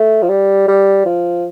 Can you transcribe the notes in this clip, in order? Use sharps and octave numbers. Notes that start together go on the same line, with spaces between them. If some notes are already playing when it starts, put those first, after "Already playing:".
Already playing: A3
F3
G3
G3
F3